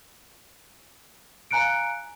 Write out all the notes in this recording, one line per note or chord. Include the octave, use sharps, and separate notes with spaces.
F5 G#5 A#5 F#6 C#7 D7